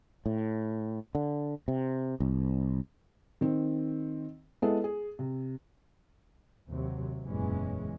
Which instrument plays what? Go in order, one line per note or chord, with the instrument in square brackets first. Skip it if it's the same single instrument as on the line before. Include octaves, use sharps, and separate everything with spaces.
[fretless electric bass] A2
D3
C3
C2
[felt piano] D#3 C4
G#3 B3 E4 G#4 A4
G#4
C3
[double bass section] D#2 C3 F#3
F#1 E2 A#2 E3 G#3 C#4